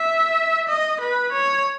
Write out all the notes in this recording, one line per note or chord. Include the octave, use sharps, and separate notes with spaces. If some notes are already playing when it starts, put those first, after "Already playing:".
Already playing: E5
D#5
B4
C#5